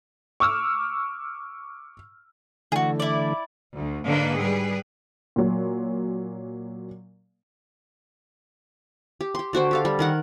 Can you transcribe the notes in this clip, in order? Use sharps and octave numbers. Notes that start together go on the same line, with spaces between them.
C#6 D6 E6 F6
D3 E3 A3 F#4 G#4
E4 D5
D2
G#2 D3 A#3 D4 B4
G3 G#4 B4
A#2 F#3
G4
G4 C6
D3 F#4 C5 G5
G4 A4 F5
G3
D#3 A#4 F#5